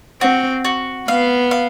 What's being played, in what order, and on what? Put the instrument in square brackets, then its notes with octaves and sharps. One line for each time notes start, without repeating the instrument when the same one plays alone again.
[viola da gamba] C4 [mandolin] F#4
[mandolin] F#4
[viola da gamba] B3 [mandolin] F5
[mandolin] F5